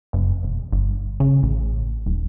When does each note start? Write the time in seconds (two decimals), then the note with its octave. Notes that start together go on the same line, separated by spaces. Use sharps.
0.13 F#1
0.43 E1
0.72 G1
1.20 C#3
1.43 A1
2.06 D#1